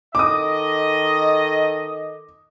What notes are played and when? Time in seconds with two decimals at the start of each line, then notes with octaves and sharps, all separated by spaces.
0.15 D#3 A4 D#5 D6 D#6